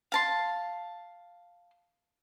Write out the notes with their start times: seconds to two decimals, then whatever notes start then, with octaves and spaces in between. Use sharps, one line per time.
0.12 F5 A5 C6